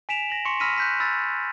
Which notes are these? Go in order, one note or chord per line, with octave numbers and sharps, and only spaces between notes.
G#5 B6 D7 E7 F7
A#6 F#7
C6 C#6 C#7
B5 E6 F6 A#6 B6 D#7
F#6 G6 B6
B5 E6 F6 A6